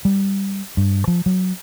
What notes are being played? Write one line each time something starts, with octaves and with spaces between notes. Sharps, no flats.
G3
G2
F3
F#3